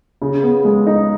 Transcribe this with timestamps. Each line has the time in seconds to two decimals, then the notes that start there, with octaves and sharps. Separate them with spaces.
0.22 C#3
0.43 B3
0.65 G#3
0.87 D#4